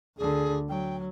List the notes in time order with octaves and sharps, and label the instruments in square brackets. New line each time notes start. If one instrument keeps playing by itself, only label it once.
[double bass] D2 D3 [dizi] G#4
[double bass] F#3 [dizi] G5